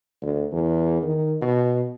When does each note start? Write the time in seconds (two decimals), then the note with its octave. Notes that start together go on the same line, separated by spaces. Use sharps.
0.22 D2
0.52 E2
1.03 D#3
1.42 B2